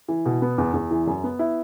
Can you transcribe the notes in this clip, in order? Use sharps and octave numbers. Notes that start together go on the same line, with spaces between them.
E3
B2
B3
E2
E2
E3
F#2
B3
E4